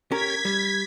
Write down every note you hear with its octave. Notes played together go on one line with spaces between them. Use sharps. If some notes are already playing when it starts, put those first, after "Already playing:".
C#4 G4 A#4 G#6 B6
G3